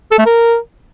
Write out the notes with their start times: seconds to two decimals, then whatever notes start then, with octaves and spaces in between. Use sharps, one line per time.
0.12 A4
0.19 A3
0.26 A#4